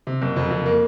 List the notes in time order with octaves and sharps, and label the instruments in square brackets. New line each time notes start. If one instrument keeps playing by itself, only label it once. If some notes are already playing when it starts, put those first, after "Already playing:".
[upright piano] C3
F#1
F2
F2
A#3